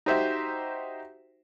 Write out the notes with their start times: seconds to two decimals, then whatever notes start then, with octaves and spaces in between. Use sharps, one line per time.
0.06 D#4 F#4 G4 C5 E5